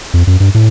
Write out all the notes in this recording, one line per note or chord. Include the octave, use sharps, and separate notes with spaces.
F2
F#2
G2
A2